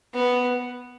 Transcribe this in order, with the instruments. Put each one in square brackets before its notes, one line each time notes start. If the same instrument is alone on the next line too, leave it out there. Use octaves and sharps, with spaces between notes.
[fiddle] B3